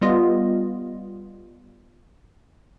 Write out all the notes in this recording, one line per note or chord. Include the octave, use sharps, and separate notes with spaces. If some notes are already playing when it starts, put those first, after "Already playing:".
G3 B3 F4 D#5